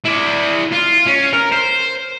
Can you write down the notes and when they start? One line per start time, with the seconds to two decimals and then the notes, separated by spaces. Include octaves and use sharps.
0.05 E4 D5
0.72 F4
1.06 C#4
1.33 A#4
1.52 C5